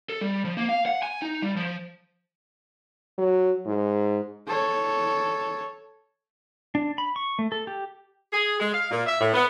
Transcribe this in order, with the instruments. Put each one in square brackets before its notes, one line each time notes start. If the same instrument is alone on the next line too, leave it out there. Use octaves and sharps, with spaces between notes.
[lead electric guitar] A4
G3
F3
A#3
F5
F#5
G#5
D#4
G3
F3
[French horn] F#3
G#2
[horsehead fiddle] A4 C#5
[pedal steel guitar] D4
B5
C#6
A3
A4
G4
[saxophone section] G#4
G#3
F5
A#2
E5
A2
B3